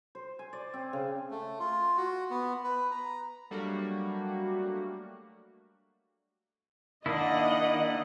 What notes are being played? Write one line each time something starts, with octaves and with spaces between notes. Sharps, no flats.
C5
G#5
D5
C4
C#3
A3
F4
F#4
B3
B4
A#5
F#3 G3 A3 A#3 D4 F#4
D#3 A#3 D4 E4 D#5 F#5